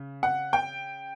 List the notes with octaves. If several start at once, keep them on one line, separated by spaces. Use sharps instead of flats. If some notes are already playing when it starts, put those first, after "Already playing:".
Already playing: C#3
F#5
G5